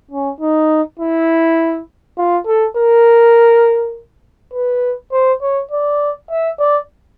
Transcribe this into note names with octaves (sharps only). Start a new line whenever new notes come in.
C#4
D#4
E4
F4
A4
A#4
B4
C5
C#5
D5
E5
D5